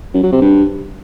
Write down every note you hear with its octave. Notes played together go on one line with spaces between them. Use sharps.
F#2
F#3
C3
G2